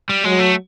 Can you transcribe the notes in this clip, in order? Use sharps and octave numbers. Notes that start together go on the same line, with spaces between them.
G3
F#3 G#3
A3